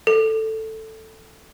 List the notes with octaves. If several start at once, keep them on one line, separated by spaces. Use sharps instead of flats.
A4